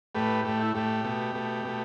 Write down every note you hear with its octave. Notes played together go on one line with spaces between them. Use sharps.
A2 A3 G4 B4
A2 A3 G4
E4
A2 A3 G4
B2 A3
B2 A3
B2 A3